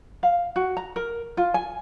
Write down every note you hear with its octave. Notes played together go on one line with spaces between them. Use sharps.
F5
F#4
A#5
A#4
F4
G#5